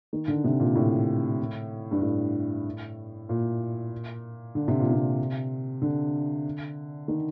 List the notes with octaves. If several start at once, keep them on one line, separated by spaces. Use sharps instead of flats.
D#3
D3
C3
A#2
A2
G2
A2
A#2
D3
C3
A#2
C3
D3
D#3